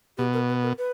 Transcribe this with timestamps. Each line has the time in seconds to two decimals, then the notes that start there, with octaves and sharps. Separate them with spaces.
0.18 B2 G4
0.33 A#4
0.49 B4
0.63 A#4
0.78 B4